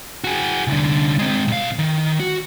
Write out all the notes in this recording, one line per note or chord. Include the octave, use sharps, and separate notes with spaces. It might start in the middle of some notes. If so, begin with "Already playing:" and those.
F#4 G#4
C2 D3
G#3 C4
B1 F5
D#3
F#4